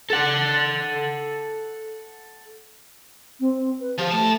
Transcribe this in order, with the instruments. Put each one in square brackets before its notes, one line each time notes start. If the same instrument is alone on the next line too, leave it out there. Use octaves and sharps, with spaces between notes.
[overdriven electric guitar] A4 F#5
[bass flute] C4
B4
[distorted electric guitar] F3 [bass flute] G4
[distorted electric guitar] A2 A5 [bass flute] A3